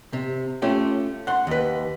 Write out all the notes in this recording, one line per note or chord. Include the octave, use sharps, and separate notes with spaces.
C3
A3 C#4 F4 G4
F#5 C6
D#2 B4